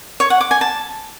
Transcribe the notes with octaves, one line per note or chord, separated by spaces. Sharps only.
C#5
F#5
D6
G#5
A5